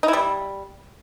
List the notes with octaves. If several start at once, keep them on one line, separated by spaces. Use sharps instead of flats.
D#4
E4
G3